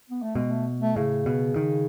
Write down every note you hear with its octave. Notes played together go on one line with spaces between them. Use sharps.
B3
A3
B2 G#3
A3
A3
A2 C#3
B2
D#3